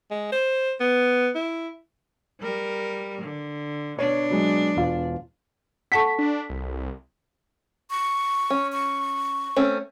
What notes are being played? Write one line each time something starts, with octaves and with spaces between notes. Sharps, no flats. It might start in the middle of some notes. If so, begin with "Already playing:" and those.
G#3
C5
B3
E4
G3 A#4
D3
B2 D4 C#5
F#3 G#3
E1 F4
A4 F#5 A5 C#6 B6
D4
C2
C#6
C#4
C#6
A3 C4 C#4